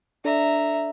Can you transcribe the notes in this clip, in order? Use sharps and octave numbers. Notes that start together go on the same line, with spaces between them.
D4 A4 D5 E5 A#5